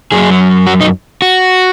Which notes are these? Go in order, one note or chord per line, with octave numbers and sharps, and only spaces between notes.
F#2 F#3 G#4
F#4
D#4
F#4